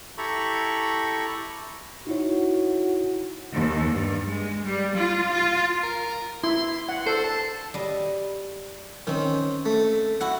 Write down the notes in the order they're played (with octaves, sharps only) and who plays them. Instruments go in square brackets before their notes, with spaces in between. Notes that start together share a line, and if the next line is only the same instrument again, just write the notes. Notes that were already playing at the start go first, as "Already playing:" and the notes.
[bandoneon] E4 G4 A4 A#5 B5 C#6
[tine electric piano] D#4 E4 C#5 [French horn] F#4
[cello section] D#2
G2
G#3
G3
F4
F4
[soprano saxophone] A#4
[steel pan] E4 [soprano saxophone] C6
[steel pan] F#5
[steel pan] A4 [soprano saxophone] C5
[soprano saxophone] A5
[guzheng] G3 D#5
[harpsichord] D#3 [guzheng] C4 C#4
[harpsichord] A3
[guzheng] E4 F#4 [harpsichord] F#5